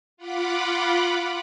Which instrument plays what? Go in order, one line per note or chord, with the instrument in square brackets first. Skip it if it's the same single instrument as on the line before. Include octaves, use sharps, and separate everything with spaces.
[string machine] F4 F#5 B5 D6